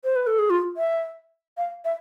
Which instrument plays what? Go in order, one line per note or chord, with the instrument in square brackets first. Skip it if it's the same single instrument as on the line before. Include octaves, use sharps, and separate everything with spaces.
[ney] C5
B4
A4
G#4
F4
E5
F5
E5